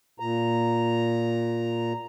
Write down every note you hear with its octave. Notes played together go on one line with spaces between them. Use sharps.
A#2 A#5